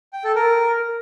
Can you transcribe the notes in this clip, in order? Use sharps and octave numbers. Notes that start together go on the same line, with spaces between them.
G5
A4
A#4